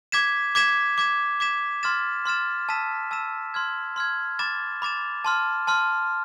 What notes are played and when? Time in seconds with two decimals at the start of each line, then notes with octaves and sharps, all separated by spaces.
0.12 D6 G#6 B6 E7
0.55 D6 G#6 B6 E7
0.98 D6 G#6 B6 E7
1.40 D6 G#6 B6 E7
1.83 C6 F6 A6 E7
2.25 C6 F6 A6 E7
2.69 A5 E6 B6 E7
3.11 A5 E6 B6 E7
3.54 C6 F6 G#6
3.96 C6 F6 G#6
4.39 B5 D6 A6 E7
4.82 B5 D6 A6 E7
5.25 A5 C6 F6
5.67 A5 C6 F6